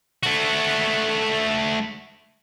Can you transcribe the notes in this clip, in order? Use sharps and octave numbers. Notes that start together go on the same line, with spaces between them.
A3 F#4